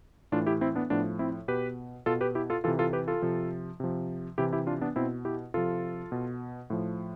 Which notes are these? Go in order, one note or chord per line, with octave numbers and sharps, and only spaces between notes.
A2 E3 D4 F4
E4 G4
C4 E4
B3 D4
A2 F3 B3 D4
C4 E4
B2 G4 B4
B2 F4 A4
G4 B4
E4 G4
F4 A4
C3 E3 F4 A4
F4 A4
G4 B4
F4 A4
C3 F3
C3 F3
C3 E3 E4 G4
E4 G4
D4 F4
B3 D4
B2 C4 E4
E4 G4
C3 F3 F4 A4
B2
A2 F3